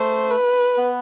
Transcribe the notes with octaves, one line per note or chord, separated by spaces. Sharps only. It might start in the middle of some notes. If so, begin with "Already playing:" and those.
Already playing: A3 C5
B4
B3